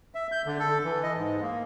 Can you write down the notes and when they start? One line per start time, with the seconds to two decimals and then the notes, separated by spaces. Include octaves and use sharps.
0.15 E5
0.32 G6
0.46 D3
0.59 A4
0.84 E3
1.03 D#5
1.17 G#2
1.42 A#3